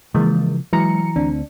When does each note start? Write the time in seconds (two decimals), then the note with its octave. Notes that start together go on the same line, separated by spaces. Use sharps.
0.15 C#3 E3 F3 G#3 A#3
0.73 E3 F#3 G#3 A#5 C#7
1.16 D2 C4 D4